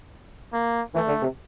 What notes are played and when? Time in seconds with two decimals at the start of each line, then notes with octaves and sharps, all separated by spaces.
0.53 A#3
0.94 E3 A3
1.08 D3
1.22 C3